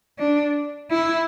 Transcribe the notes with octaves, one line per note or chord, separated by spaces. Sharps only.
D4
E4